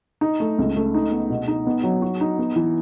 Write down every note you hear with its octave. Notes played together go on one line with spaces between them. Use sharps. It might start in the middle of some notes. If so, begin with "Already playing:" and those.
D#4
A3
C#2
A3
D#4
B3
B2
D#4
B3
F#3
F#4
D#4
B3
E3